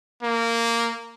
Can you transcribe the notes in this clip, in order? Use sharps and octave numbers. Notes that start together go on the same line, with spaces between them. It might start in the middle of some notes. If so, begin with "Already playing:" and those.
A#3